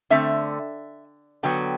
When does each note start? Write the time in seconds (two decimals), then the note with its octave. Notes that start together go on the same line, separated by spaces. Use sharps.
0.10 D3 A3 C4 E5
1.43 D3 F#3 B3 G5